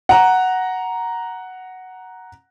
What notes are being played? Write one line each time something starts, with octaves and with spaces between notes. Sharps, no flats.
F#5 A#5